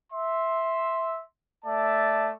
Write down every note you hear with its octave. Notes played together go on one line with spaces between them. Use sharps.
E5 C6
A3 D5 E5 A5